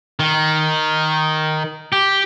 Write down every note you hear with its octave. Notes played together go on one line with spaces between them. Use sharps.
D#3
G4